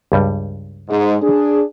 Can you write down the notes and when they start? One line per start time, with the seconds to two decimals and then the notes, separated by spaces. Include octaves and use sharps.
0.12 C#2 G2 G3
0.89 G#2
1.22 D4 G#4